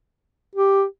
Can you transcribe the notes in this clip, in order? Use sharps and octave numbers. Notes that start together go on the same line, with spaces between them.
G4